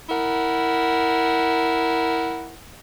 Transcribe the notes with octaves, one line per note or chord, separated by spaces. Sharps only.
E4 A#4 F#5